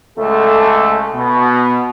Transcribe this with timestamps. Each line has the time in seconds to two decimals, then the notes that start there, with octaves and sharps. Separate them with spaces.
0.18 C#2 A3 A4
1.14 B2